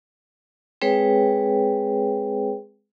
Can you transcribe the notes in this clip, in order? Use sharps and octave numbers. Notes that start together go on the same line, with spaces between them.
G#3 C4 G#4 B4 C#5 G5